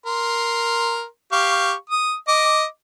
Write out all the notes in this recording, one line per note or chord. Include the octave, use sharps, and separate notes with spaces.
A#4 C6
G4 F5 C#6
D#6
D#5 D6